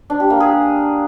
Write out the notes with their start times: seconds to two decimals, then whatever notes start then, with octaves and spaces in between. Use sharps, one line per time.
0.10 D4
0.20 G4
0.30 A#3
0.40 G#4